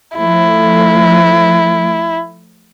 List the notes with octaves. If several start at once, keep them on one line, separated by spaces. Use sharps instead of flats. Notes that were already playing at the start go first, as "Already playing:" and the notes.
F3 A3 E4